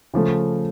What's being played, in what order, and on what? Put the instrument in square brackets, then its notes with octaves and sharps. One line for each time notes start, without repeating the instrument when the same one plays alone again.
[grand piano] C#3 F3 A3